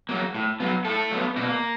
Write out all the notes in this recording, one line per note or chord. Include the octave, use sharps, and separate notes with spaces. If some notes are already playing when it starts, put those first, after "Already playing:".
F#3 A#3
A2
F#3 B3
A2 A3 A4
F#3 B3
B2 A#3 A#4